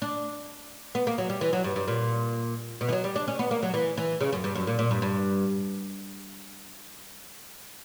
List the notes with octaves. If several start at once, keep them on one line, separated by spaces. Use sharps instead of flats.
D4
B3
A#3
F#3
G3
E3
F#3
G2
G2
A#2
B2
E3
F#3
G3
D4
C#4
B3
A#3
F#3
E3
E3
C#3
F#2
G2
F#2
A#2
A#2
G2
G2